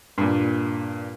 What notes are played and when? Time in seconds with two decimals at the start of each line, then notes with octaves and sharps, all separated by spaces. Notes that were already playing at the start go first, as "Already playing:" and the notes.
0.18 G2 A#2